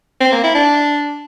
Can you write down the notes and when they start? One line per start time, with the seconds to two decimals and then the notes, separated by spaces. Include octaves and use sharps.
0.21 C4
0.32 A#3
0.44 E4
0.55 D4